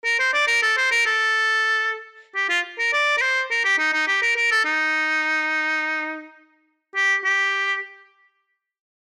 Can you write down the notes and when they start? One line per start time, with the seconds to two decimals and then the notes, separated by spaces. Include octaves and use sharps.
0.05 A#4
0.19 C5
0.33 D5
0.47 A#4
0.62 A4
0.77 C5
0.91 A#4
1.06 A4
2.35 G4
2.49 F4
2.79 A#4
2.93 D5
3.17 A#4
3.21 C5
3.51 A#4
3.64 G4
3.78 D#4
3.93 D#4
4.08 G4
4.22 A#4
4.36 A#4
4.51 A4
4.65 D#4
6.95 G4
7.24 G4